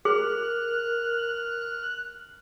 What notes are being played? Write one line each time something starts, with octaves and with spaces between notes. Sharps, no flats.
G#4 A#4 F6 F#6